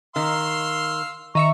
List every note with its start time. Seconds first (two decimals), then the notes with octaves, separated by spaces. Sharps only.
0.16 D#3 F5 C6 E6
1.35 D#3 E5 A#5 C#6 C#7